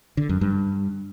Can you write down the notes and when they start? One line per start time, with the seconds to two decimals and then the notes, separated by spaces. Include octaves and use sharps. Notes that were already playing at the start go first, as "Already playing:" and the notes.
0.17 D3
0.29 F#2
0.41 G2